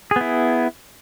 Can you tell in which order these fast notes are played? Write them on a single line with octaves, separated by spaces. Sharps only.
G#4 B3 E4